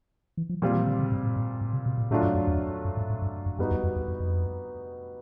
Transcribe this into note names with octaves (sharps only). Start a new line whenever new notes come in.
E3
F3
A#2 F3 G3 C4 F4
E3
D3
C#3
G#2
A2
G#2
A2
C3
B2
A#2
A2 D3 F#3 A3 D4 F4
G2
F#2
E2
F#2
G#2
G#2
G2
F#2
F#2 G3 B3 D#4 F#4
E2
F2
E2
F2
F2